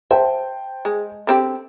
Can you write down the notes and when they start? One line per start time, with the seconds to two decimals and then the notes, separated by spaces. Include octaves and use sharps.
0.11 C5 E5 G5 A5
0.85 G#3
1.27 D3 C4 G4